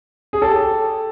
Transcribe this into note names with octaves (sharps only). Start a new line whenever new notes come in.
G#4
G4 A4